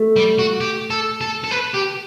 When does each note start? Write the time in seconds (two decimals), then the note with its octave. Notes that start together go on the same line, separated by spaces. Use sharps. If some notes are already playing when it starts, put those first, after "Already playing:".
Already playing: A3
0.16 G3
0.39 F#4
0.61 G4
0.90 A4
1.21 A4
1.44 A4
1.51 B4
1.74 G4